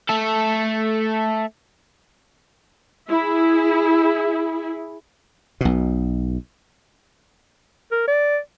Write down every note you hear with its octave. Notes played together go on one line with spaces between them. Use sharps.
A3 A4
E4 G#4
B1 B2
A#4
D5